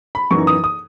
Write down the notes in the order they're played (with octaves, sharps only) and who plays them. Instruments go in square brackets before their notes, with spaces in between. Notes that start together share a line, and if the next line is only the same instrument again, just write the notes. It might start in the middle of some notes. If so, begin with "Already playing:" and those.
[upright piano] B5
F#2 E3 B3 D#4 C#6
D#6
D#6